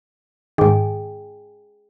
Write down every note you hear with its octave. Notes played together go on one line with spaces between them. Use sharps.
G#2 D#3 G#4 G5 D6